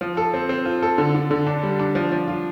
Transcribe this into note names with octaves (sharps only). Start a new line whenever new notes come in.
F3
A4
C4
C4
F4
A4
D3
D3
D3
D4
G3
D4
F3
F3
F4